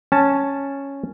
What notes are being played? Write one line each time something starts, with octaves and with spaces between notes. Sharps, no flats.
C#4 A5